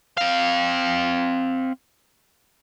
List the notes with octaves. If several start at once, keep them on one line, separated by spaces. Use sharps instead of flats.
C4 F5